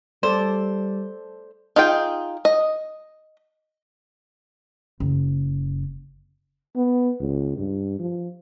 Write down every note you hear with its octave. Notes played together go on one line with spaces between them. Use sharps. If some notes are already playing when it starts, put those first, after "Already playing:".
G3 A4 C5 D5
D#4 F4 G#4 G5
D#5
F#1
B3
C#2
G2
F3